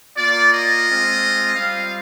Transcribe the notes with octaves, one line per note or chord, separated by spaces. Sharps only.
A#3 F4 D5
D#5
G#3 C4 F4
G3 C4 F4 F5